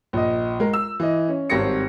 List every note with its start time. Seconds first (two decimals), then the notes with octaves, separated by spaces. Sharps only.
0.13 A#1 D#5
0.60 G#3 A#4
0.73 E6
1.00 E3 D#5
1.29 C#4
1.50 G#1 G3 C4 C#5 A#6 C#7